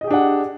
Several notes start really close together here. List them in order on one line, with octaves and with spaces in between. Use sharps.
D#5 G#4 G4 D4 F#5